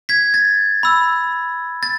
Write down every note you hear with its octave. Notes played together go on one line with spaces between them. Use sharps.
G#6 B6
A6
B5 E6
A6